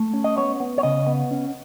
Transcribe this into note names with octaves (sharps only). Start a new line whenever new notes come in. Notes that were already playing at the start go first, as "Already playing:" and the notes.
Already playing: A3
C#4
D#5
B3 C#5
B3
C#5
C#3 D#5
B3
C#4